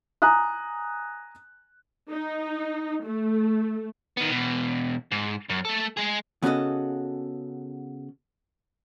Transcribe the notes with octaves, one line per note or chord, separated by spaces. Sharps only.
G#5 A#5 D#6 F#6
D#4
A3
D#3 B3
E2 B2
G#2
F#2
A3 A4
G#3 G#4
C#3 B3 C#4 F#4 A4 D#5